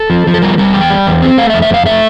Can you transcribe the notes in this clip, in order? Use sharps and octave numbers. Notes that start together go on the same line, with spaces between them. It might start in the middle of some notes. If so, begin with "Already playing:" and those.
Already playing: A4
F3
F3
A4
G3 A#4
G3 A#4
E2 G5
G3
E2
C4
A3 F5
E5
F2
E5
F2 F5
A3 E5